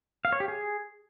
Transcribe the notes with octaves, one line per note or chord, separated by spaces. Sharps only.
F5
C#5
G4
G#4